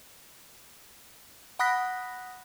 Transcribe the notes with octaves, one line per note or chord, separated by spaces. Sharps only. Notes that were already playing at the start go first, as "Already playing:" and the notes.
F#5 B5 D#6 F#6 A#6 B6